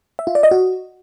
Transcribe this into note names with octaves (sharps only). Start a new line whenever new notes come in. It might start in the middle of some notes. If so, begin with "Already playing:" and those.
E5
F4
D5
D#5
F#4